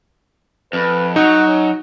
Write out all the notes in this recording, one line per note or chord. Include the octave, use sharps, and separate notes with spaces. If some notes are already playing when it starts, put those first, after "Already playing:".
F2 B4
F#3 D#4 F#4
C#4